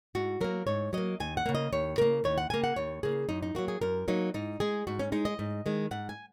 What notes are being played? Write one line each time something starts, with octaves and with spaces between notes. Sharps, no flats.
G#2 F#4
F#3 A#3 A#4
G#2 C#5
F#3 A#3 D#5
D#2 G#5
F#5
C#3 A#3
D#5
D#2 C#5
C#3 A#3 A#4
D#2 C#5
F#5
C#3 A#3 G#5
F#5
D#2 C#5
C#3 A#3 G#4
F#2 D#4
D#4
F#3 A#3 F#4
G#4
F#2 A#4
F#3 A#3 D#4
G#2 D#4
G#3 G#4
G#2 F#4
C#4
G#3 D#4
D#5
G#2
D#3 G#3
G#2 F#5
G#5